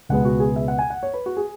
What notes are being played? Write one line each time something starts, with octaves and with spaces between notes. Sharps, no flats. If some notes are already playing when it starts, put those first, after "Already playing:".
C#2 B2 G#3 B3 F#5
F#4
G#4
E5
F#5
G#5
F#5
C#5
B4
F#4
G#4